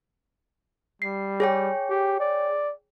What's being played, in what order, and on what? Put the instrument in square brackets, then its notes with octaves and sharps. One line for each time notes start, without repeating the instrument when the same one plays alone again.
[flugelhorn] G3 [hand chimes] C7
[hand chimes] G#4 C#5 G5
[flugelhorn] G4
D5